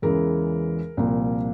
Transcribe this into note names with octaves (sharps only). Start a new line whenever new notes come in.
E2 C#3 E3 G#3 G#4 A#4
C2 A#2 F3 A#3